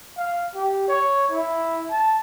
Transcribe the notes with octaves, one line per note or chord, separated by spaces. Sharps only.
F5
G4
C#5
E4
A5